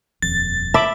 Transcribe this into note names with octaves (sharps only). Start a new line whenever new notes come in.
D#1 F2 A6
E5 A5 B5 D6